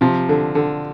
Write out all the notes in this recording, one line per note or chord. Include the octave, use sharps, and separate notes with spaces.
C3 F3
D3
D3